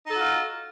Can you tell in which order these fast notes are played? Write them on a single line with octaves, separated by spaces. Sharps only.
D#4 A4 F#4 F4